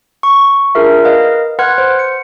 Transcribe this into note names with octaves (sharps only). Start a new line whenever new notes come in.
C#6
D4 F4 G#4 A#4 E5
A#4 B4 D#5 F5
B4 F#5 C6 F6 F#6 G#6
C5
C#7